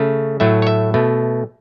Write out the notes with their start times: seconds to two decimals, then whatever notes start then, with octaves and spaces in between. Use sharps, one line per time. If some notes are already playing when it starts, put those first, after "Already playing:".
Already playing: C#3 A3
0.40 A2 F#3 A3 E5
0.62 C#5
0.67 E5
0.94 B2 A3